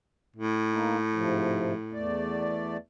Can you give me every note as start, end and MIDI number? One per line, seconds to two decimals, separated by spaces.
0.36 2.12 45
0.71 0.97 58
0.71 0.97 63
1.14 1.74 44
1.14 1.74 48
1.14 1.74 53
1.93 2.77 40
1.93 2.77 57
1.93 2.77 74